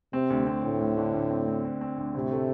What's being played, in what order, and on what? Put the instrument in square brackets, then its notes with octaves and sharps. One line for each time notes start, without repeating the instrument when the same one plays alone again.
[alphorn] C3 [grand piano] C4
[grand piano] D2
C4
[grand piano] D2 [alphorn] A2
[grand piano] D2
D3
D2
C4
C4
C4
C4
D2
[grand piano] A2 [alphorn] C3
[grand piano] A3